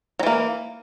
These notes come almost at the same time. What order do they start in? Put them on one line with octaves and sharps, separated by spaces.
F#3 E3 A#3